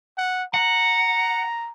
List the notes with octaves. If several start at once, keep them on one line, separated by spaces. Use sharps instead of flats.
F#5
F#5 A#5